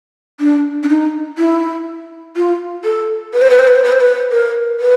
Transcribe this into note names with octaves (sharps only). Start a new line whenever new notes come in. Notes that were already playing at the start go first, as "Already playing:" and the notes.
D4
D4
D#4
E4
F4
A4
B4
C5
B4
C5
B4
C5
B4
C5
B4
A#4
B4